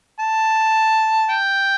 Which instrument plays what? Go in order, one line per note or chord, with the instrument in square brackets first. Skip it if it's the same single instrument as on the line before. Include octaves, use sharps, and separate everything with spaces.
[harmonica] A5
G5